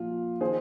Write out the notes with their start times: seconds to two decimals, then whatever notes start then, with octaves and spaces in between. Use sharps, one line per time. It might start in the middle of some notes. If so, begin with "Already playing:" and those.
Already playing: A#2 F3 F4
0.41 D#3 G#4 C5